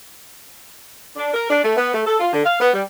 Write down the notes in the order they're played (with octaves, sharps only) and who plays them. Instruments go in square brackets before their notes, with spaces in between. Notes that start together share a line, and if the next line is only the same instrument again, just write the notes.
[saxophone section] D4
A#4
D4
A3
B3
A3
A4
F4
D3
F5
B3
G3